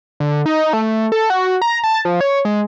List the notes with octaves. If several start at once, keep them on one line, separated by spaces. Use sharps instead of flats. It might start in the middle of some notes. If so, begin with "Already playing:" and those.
D3
D#4
A3
A4
F#4
A#5
A5
F3
C#5
G#3